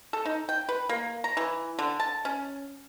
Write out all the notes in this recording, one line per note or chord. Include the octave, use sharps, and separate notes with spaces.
A4
D#4
G5
B4
A#3
A#5
E3
D3
A5
C#4